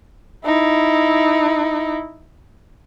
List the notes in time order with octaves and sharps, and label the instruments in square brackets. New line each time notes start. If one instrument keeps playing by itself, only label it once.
[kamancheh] D#4 E4